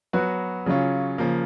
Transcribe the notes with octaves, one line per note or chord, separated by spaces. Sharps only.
F#3 B3 F#4 B4
C#3 F#3 C#4 F4
C#3 F3 A#3